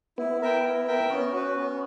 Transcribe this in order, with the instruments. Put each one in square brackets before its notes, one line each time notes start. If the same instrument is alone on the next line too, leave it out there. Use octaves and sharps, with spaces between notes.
[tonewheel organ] B3 [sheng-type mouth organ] E4
[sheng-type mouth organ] A#4 E5 G5
E4
A#4 E5 G5
[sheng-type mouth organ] B3 [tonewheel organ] C#4
[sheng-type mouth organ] F#4 B4
B3